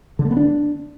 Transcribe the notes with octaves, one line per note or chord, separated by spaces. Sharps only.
D3
A3
B3
D4